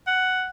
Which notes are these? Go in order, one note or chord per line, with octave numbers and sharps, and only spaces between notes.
F#5